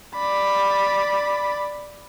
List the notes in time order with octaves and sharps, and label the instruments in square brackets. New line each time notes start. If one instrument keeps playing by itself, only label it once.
[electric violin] D5 B5